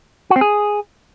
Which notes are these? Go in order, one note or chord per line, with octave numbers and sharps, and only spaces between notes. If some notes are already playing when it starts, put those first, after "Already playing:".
F#4
C4
G#4